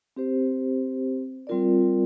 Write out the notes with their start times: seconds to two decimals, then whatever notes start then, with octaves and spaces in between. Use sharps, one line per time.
0.16 C4 G4 C5
1.47 G3 C4 F4 A#4 D5